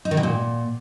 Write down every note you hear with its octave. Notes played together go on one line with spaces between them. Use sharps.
D#4
D#3
B2
A#2